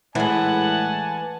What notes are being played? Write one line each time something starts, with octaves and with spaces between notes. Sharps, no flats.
A2 E3 G#3 D5 F#5 G#5 A5